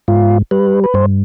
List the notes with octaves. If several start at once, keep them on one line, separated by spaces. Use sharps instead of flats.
G#2 F4
G3 B4
B4
G2 C5